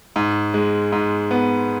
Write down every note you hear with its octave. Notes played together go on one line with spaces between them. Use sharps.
G#2
G#3
G#2
B3